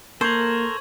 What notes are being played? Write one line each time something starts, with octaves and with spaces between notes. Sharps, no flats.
A#3 A4 A#4 C5 C#6 G#6 F#7